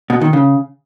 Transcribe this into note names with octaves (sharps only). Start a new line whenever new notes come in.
B2
D#3
C#3